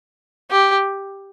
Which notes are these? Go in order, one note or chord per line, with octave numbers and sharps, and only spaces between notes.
G4